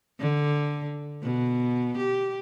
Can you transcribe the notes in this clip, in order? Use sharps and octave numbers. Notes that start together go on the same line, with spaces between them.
D3
B2
G4